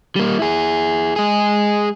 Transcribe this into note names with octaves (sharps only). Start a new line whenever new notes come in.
G3 A#3
E4 G#4
G#3 G#4